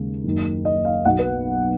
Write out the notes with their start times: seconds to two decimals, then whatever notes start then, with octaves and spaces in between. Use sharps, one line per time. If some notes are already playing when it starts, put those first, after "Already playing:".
Already playing: D#2 C#3 G#3
0.24 F#1 F#2 D#3
0.65 D#5
0.85 F5
1.05 B1 B2 F#3 F#5
1.19 B4